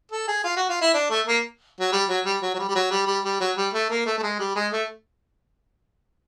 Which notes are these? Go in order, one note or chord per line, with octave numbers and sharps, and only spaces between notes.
A4
G#4
F4
F#4
F4
E4
D4
A3
A#3
F#3
G3
F#3
G3
F#3
F#3
G3
G3
F#3
G3
G3
G3
F#3
G3
A3
A#3
A3
A3
G#3
G3
G#3
A3